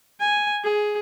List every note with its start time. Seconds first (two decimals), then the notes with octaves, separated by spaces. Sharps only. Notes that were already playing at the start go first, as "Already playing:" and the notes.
0.20 G#5
0.64 G#4